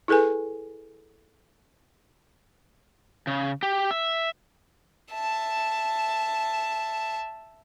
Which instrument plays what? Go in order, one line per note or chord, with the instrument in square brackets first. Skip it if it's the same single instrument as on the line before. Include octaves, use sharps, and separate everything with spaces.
[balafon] E4 G#4 A4 B4 G#5
[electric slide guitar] C#3
G4
E5
[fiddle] E5 A5